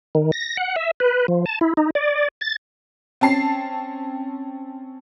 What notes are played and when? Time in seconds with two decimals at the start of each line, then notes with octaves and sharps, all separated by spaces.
0.15 D#3
0.32 A#6
0.57 F#5
0.76 E5
1.00 B4
1.28 F3
1.46 A5
1.61 E4
1.77 D#4
1.95 D5
2.41 A6
3.21 C4 C#4 A5 C7